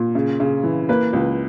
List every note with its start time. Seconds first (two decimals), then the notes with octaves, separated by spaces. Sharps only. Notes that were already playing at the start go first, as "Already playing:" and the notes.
Already playing: A#2
0.15 C#3
0.40 C#3
0.63 E3
0.89 A#3 B4
1.13 C#2